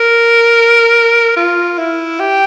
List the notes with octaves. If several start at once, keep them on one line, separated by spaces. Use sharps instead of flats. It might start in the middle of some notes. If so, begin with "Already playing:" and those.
Already playing: A#4
F4
E4
G4